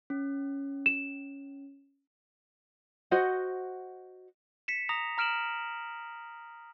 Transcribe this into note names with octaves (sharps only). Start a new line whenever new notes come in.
C#4
E7
F#4 C5 D#5 F#5
B6 C#7 E7
A#5 D#6 A#6 F7
A#5 F6 D7 E7 F#7